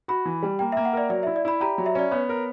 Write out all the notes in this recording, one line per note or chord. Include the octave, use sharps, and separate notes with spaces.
F#4 B5
E3
G3
A#3 G5
E5
A#3
F#5
A#4 D5
F#3 D5
E5
E4
D5
E4 B5
G4 A#5
F#3
E5
C#4 D5
B3 C#5
A#4